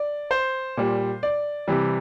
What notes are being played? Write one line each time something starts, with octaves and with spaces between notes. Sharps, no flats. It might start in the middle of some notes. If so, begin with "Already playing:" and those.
Already playing: D5
C5
A#2 G3
D5
C3 E3 G3